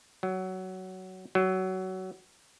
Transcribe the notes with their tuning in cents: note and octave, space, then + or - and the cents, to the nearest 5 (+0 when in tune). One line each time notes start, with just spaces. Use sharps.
F#3 +15
F#3 +20